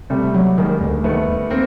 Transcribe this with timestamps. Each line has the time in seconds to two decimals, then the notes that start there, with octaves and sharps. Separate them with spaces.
0.10 C3 G3 A3
0.34 F#3
0.58 D#3 G#3 A#3
0.81 D2
1.04 D#3 A3 B3
1.27 D#2
1.50 A#3 C4